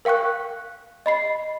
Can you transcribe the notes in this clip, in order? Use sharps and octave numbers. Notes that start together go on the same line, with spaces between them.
A#4 F5 G5 C#6 F#6
D#5 B5 C7